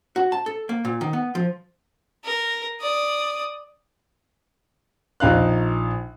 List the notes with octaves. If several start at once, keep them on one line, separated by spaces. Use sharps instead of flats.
F#4
A5
A4
A#3
A#2
D#3
B3
F3
A#4
D5 D#6
A#1 D#4 F5 F#6